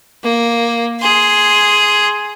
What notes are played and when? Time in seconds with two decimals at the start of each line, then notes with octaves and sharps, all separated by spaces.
0.23 A#3
1.01 G#4 C6